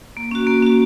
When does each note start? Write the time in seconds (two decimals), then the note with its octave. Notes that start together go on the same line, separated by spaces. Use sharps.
0.17 A#3
0.31 C#4 F#4
0.47 A#3
0.63 C#4 F#4